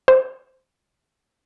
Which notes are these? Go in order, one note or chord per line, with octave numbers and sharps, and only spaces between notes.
C5